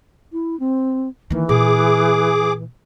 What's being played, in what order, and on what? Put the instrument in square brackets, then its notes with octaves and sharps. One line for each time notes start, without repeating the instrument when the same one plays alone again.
[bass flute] E4
C4
[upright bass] D#3 A#3 [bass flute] E3
[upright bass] A#2 [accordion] G#4 D6